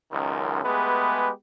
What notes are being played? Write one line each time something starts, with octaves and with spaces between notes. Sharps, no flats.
C#2 F#2 D#3
G#3 A3 B3 G4 G#4 B4